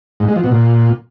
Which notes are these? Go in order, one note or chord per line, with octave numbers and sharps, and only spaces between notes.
G#2
G#3
F3
B2
A#2